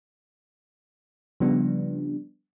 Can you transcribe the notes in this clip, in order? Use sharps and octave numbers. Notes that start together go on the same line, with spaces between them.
C#3 F3 G3 B3 D4